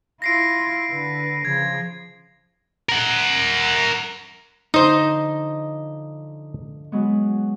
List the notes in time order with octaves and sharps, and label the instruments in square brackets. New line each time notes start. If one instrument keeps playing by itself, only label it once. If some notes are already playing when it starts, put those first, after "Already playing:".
[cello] E4 F4 [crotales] A#6 C7 D7
[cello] D3 B4
[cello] C#3 F3 [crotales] G#6
[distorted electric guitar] A#4 F#5
[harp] D3 F3 [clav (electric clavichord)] D#4 C5 [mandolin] D#5
[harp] F#3 G#3 B3